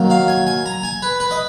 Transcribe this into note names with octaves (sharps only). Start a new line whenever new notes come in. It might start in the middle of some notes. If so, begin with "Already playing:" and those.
Already playing: D#3 F#3 A#3
F5
G#5
G#5
A#5
G#5
B4
B4
D#5